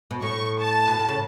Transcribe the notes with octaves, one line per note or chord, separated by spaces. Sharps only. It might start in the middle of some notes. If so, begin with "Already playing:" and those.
B2
A2 C#6
A5
B2
A2
C#3